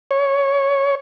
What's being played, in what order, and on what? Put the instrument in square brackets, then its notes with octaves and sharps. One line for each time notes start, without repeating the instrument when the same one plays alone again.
[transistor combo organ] C#5